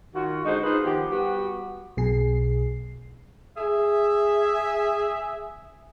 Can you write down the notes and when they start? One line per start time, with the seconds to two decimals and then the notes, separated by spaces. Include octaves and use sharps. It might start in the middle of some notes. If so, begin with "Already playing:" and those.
0.14 D#3 F4 F#4
0.45 D3 G#3 D#4 F#4 C5
0.64 D#4 F4 G#4 B4 C5
0.84 D#3 F3 B3 G4
1.10 G3 B3 F#4 G4
1.97 B1 B2 G#4 C7
3.57 G#4 E5